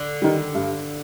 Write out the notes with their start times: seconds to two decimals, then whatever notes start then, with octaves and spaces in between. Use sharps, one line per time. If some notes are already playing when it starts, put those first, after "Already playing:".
Already playing: D3
0.22 D#3 G3
0.55 G2